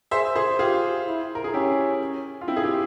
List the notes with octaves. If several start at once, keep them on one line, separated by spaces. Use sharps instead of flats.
G#4 C5 E5
G#4 C5
F4 G4 G#4
E4
A#4
G#4
C#4 E4 G4
F4
C4 E4
G#4
E4 G4